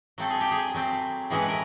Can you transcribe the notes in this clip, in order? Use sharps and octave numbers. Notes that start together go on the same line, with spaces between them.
F#3 A3 C4 A4
G#4
G4
G#4
F#3 A3 C4
A2 E3 G#3 C#4 E4 G#4
B4
A#4